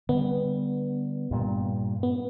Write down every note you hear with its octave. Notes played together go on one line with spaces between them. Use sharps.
D3 G3 B3
G2 A#2 G3
B3